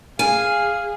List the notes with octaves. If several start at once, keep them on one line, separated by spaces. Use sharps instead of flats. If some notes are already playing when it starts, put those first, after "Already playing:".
G#4 F5 G#5